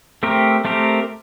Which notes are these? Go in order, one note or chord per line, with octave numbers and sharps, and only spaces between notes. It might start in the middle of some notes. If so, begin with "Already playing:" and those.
A3 C4 G4 A#4
A3 C4 G4 A#4